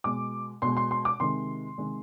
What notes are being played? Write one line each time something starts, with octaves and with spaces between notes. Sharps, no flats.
B2 G#3 D6
B2 G#3 C6
C6
C6
D6
C3 D#3 G#3 C6
C3 D#3 G#3